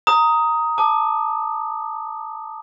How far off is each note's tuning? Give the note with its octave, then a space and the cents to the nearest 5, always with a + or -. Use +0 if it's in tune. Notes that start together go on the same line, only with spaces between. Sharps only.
A#5 -5 D#6 +10
A5 +0 D6 +30